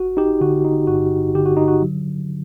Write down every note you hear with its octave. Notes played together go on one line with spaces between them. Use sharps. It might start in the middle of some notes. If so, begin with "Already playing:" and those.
Already playing: G1 F#4
D#4 G4
D3 F#4
D#4
G2 F#4
D3 G4
F#4
D#4
F#4
F#3